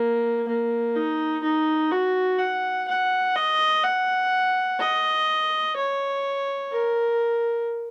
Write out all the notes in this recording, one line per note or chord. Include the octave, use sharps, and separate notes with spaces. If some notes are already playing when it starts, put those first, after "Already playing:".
Already playing: A#3
A#3
D#4
D#4
F#4
F#5
F#5
D#5
F#5
D#5
C#5
A#4